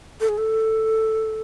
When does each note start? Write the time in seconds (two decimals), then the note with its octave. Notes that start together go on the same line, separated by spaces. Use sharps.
0.20 A4
0.29 G#4
0.38 A4